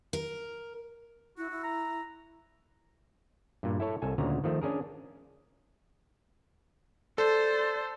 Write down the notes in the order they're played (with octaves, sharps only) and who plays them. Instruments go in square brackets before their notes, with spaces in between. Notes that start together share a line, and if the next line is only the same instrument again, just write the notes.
[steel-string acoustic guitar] A#4
[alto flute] E4 [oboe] F#4
[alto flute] E4
[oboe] A#5
[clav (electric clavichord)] G2 A#2
E4 A4 C#5 A5
C2 A4 G#5
D2 A#2 C#3 A#5
D#3 F3 A3
C#4 D4 G#4 A#4
[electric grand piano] A4 [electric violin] C5 [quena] D5